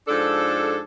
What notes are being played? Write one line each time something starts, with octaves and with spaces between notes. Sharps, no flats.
G#2 F3 D4 A4